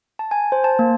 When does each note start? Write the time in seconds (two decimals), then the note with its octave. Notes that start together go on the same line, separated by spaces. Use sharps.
0.19 A5
0.31 G#5
0.52 C5
0.64 A5
0.79 A#3